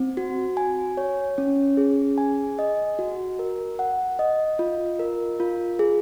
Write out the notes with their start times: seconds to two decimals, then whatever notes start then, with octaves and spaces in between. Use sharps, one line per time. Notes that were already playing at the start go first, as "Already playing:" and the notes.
Already playing: C4
0.17 F#4
0.57 G#5
0.97 C#5
1.38 C#4
1.77 G#4
2.18 G#5
2.59 D#5
2.99 F#4
3.39 A#4
3.79 F#5
4.19 D#5
4.59 F4
4.99 A#4
5.40 F4
5.79 G#4